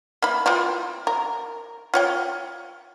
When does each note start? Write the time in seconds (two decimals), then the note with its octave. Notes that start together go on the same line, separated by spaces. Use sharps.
0.22 A#3 E4 B5
0.46 C4 E4 F4
1.07 A#4
1.94 F4 C#5 G5